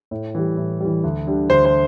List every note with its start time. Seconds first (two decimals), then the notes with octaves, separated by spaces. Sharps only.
0.11 A2
0.35 E3 G3
0.57 A2
0.80 E3 G3
1.04 D2
1.27 D3 G3
1.50 D2 C5
1.65 C5